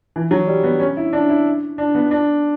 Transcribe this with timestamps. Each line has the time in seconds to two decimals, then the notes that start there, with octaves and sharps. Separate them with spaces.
0.16 E3
0.31 F#3
0.47 G3
0.64 B3
0.80 C#4
0.97 E4
1.13 D4
1.30 E4
1.78 D4
1.95 B3
2.11 D4